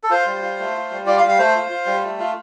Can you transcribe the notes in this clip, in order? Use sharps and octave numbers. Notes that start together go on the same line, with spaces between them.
A4
F4 C5
G3
F4
A3
F4
G3
F4 D5
F5
G3
F5
A3 C5
F4
F4
G3
A3
F4